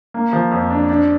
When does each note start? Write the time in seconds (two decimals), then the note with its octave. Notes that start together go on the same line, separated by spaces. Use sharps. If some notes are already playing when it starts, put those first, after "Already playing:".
0.14 A#3
0.33 F3
0.51 F2
0.70 D4
0.89 D4